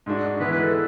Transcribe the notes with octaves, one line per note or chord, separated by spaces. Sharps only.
G#2 G#3 D4 F#4
E3 G#3 B3 E4 B4
B4
A4